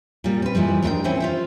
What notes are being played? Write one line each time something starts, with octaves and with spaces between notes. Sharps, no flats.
A#2 G3
C4 B4
G#2 E3 F3 G3
D#2 D4 E4 A4 C5 G5
E3 C4 C#4 E4 C5
F4 C5 E5